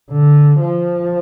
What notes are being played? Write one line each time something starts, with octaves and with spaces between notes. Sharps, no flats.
D3
F3